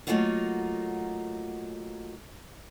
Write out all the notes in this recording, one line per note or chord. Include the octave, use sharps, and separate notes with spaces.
F#3 A3 A#3 D#4 F4 F#4